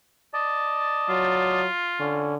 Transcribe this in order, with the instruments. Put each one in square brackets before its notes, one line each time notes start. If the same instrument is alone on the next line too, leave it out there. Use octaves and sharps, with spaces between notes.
[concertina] D5 D#5 A5
[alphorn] F#3 [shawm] F4
[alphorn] D3 [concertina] C#4